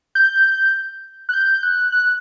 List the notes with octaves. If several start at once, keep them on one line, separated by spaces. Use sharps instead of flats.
G6
F#6
G6
F#6
F#6